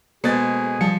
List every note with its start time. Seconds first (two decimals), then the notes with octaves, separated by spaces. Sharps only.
0.24 B2 G#3 A#3 G#4 A4 C5 A6
0.81 F3 G3 C#7